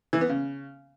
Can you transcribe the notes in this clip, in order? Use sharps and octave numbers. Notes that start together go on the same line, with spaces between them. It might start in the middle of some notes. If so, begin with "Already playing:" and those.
E3
B3
C#3